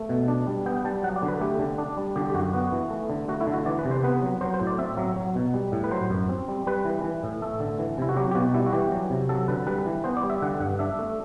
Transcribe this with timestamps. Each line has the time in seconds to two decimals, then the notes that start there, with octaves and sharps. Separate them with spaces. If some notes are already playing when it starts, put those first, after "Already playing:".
Already playing: A3
0.09 B2
0.28 D4
0.47 G3
0.66 B3 G5
0.77 G5
0.84 G3 A5
1.03 F#3 F#5
1.16 D5
1.23 D3
1.28 B4
1.40 A3 G4
1.59 D3
1.78 D4
1.97 G3
2.16 D3 G4
2.30 G4
2.34 F#2 F#4
2.53 B3 F#4
2.72 E3
2.90 A3
3.10 D3
3.28 A3 F#4
3.41 E4
3.47 D3
3.54 F#4
3.66 E3 D5
3.79 B4
3.85 C3
3.91 C5
4.03 B3 B4
4.22 F#3
4.41 F#3 C5
4.54 C5
4.60 A2
4.67 D5
4.78 C4 E5
4.97 F#3 E5
5.16 F#3
5.35 B2
5.54 G3
5.72 A2
5.84 B4
5.91 F#3 C5
6.10 F#2
6.29 C4
6.48 G3
6.67 G3 B4
6.85 E3
7.04 E3
7.23 A2
7.42 A3 A4
7.60 D3
7.79 E3
7.98 C3 E4
8.09 F#4
8.16 F#3 G4
8.31 G4
8.35 B2 F#4
8.54 G3 E4
8.66 F#4
8.73 E3 G4
8.92 F#3
9.10 C3
9.29 F#3 A4
9.48 D3 B4
9.67 G3 B4
9.86 E3
10.04 B3 C5
10.17 D5
10.23 G3
10.30 E5
10.42 D3 F#5
10.60 G2 F#5
10.79 D4 E5
10.99 A3